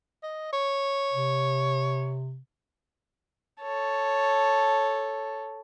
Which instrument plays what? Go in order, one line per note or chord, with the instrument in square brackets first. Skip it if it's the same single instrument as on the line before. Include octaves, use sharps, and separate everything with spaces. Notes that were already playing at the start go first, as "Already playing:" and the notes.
[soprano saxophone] D#5
C#5
[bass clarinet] C3
[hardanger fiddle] A4 C#5